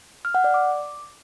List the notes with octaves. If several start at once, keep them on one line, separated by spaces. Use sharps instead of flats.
F6
F#5
D5
D6